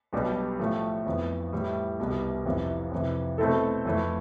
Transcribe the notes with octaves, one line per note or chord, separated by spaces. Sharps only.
B1 B2 G3 D4 G4
A2 F3 A3
F2 E3 B3
A2 E3 G3
C2 B2 G3 B3
F1 F2 C3 E3
F2 C3 E3
B2 A3 C4 E4 A4
F2 E3 A3 E4